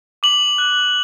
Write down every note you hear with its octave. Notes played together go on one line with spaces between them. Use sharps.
D6 F#7
F#6